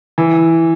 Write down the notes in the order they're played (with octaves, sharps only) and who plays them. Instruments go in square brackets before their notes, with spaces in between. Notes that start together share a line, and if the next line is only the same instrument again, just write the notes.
[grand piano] E3